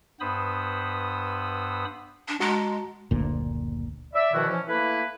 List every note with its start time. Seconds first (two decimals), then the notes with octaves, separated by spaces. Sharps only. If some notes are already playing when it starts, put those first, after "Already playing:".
0.20 G2 B3 C5 B5 D#6 E6
2.28 D4
2.40 G#3 F#4 A5 A#5
3.11 F#1 D2 A#2
4.14 D5 E5
4.33 E2 B2 D#3 F3 E4 F#4
4.48 E3 F3 C#4
4.68 A3 A#3 E4 B4